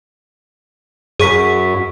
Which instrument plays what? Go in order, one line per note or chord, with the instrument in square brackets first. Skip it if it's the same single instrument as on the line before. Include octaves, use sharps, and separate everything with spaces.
[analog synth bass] F#2 [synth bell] G#4 C#6 B6